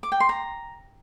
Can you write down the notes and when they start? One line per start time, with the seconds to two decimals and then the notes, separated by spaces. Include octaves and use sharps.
0.03 D6
0.12 G5
0.20 C6
0.29 A#5